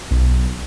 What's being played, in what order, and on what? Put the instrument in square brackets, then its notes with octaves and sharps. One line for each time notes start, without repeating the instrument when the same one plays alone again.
[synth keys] B1